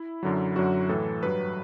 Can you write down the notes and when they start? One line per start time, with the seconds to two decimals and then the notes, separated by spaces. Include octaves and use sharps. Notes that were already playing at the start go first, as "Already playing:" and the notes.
Already playing: E4
0.23 F#2 D3 F#3
0.56 F#2 D3 F#3 F#4
0.89 A2 E3 A4
1.22 G2 F#3 B4